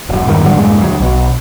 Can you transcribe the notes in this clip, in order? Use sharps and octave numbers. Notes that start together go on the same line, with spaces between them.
E1 F#2
F#1 E2 G2 D#3
G#2 D3 F#3 G3
E2 G2 A#2 G#3
D2 F#3
B1 B2